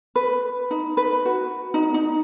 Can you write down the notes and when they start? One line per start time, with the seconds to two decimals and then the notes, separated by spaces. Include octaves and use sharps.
0.16 B4
0.71 D#4
0.97 B4
1.25 F#4
1.74 D#4
1.94 D#4